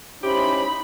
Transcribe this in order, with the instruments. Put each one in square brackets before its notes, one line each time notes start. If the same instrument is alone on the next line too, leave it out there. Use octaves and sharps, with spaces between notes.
[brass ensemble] C#4 E4 C5 [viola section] D#4 B5 [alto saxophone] G4